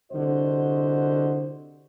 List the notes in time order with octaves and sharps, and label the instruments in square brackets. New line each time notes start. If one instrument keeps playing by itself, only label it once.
[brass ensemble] C2 D3 F#4 C5 D#5